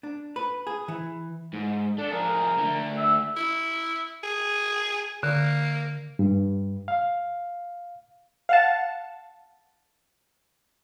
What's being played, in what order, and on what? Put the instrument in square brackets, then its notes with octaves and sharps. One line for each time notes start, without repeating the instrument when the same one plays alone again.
[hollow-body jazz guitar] D4
B4
G#4
E3
[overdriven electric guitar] G#2
[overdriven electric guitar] A3 [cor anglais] D4
[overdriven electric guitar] F3 G#4 [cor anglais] A#4
[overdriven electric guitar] D3 A3
[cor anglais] E5
[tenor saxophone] E4
G#4
[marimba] D3 [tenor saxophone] A#3
[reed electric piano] G2
F5
[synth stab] F5 F#5 A5